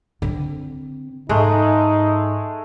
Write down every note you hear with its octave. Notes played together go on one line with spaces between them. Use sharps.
D3 C4
G#2 G#3 A3 D#4